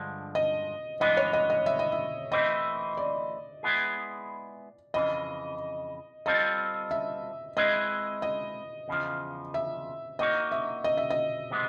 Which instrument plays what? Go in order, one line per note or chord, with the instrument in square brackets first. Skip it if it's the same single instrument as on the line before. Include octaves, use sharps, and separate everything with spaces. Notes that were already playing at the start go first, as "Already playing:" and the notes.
Already playing: [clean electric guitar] G2 D3 F3 G#3
[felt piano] D#5
[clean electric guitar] G2 E3 G#3 B3 D4 [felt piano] D#5
[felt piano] C#5
D#5
D#5
E5
D#5
E5
[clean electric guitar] E3 A3 C4 E4 [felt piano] D#5
[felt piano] D5
[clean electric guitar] G#3 B3 E4 G#4
[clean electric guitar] F2 C#3 E3 [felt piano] D#5
[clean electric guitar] G3 C4 F4 A4 [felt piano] D#5
[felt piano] E5
[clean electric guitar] G#3 C4 E4 G#4 B4 [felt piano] D#5
[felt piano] D#5
[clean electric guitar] E2 C#3 F3
[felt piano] E5
[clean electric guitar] A#3 D#4 F#4 A4 C#5 [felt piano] D#5
[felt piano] E5
D#5
E5
D#5
[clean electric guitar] C3 E3 G#3 B3